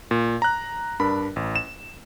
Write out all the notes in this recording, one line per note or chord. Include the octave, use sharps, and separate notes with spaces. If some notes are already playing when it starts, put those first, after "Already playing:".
A#2
A#5 F#6
G2 D4 A#4 B5
A1
E7